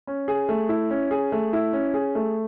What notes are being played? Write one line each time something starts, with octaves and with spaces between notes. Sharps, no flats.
C#4
G#4
A3
E4
C#4
G#4
A3
E4
C#4
G#4
A3